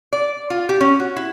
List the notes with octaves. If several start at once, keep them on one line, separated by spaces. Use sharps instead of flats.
D5
F4
G4
C#4
F#4
E4